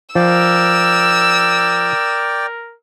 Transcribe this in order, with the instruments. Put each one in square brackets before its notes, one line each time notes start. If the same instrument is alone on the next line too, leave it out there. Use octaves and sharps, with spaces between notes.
[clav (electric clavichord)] F3 [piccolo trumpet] A#4 [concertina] D5 G5 [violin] E6